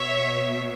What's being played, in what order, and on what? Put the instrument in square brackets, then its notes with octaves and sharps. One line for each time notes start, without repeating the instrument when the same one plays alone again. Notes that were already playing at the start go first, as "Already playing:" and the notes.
Already playing: [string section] B2 C#5 E5